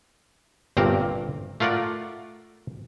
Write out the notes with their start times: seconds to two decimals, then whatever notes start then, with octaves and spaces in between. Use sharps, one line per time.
0.77 G1 G2 A#2 C4 A#4
1.60 A3 F4 A#4 D5 F#5